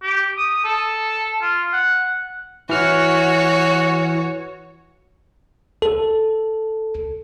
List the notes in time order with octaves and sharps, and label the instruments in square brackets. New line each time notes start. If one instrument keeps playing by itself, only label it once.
[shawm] G4
D#6
A4
F4
F#5
[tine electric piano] E3 F6 [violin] F#4 C#5
[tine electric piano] A4